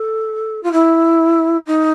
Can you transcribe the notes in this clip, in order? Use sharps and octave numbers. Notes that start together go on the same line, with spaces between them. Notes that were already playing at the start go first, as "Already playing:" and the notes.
Already playing: A4
F4
E4
D#4